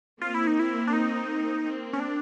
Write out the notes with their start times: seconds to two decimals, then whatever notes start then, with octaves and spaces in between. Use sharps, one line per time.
0.21 A#3 C4 F4
0.34 E4
0.47 D#4
0.59 E4
0.87 D4
0.93 D#4
1.64 A#3 C4
1.93 C#4
2.00 D4